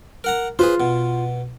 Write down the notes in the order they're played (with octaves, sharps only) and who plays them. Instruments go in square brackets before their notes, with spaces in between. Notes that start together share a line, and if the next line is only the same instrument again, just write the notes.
[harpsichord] A#4 F#5 A#5
[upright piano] F4 [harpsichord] G#4 B4 C5
[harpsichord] B2